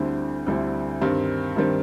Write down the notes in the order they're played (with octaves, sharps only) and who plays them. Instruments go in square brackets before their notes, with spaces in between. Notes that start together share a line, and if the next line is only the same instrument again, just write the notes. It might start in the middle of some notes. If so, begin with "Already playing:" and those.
Already playing: [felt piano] D2 D3 G3 C4 E4
D2 D3 G3 C4 E4
G2 D#3 G3 C4
G2 D#3 G3 C4